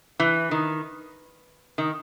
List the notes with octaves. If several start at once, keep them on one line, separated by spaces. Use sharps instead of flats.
E3
D#3
D#3